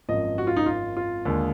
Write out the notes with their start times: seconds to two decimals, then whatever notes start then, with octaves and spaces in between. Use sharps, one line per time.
0.09 G#1 F#2 F3 D#5
0.38 F#4
0.47 F4
0.56 D#4
0.66 F4
0.97 F4
1.25 D#2 D3 G#3